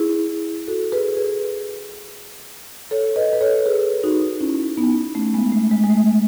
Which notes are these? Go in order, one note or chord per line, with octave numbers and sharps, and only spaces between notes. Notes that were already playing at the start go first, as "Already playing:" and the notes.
Already playing: E4 G#4
F#4 A4
G#4 B4
G#4 B4
A4 C#5
B4 D#5
B4
A4 C#5
G#4 B4
D#4 F#4
C#4 E4
B3 D#4
A3 C#4
G#3 B3
A3
G#3
G#3
A3